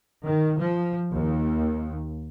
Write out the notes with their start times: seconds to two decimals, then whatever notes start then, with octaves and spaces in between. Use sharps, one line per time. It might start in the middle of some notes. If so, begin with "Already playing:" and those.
0.25 D#3
0.60 F3
1.13 D#2